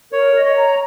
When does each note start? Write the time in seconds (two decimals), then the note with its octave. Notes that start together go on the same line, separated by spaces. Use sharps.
0.12 A#4 C#5
0.34 D#5
0.45 C#5
0.56 A#5